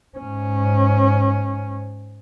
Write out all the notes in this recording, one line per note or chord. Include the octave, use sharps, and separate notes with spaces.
G#2 C#4